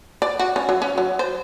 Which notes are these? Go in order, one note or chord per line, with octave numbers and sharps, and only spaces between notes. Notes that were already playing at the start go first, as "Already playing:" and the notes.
D5
F#4
C#4
F#3
C#4
F#3
C5